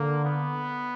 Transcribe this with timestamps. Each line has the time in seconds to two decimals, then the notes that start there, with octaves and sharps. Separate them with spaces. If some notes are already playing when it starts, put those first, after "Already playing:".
Already playing: D3 A#3
0.25 B3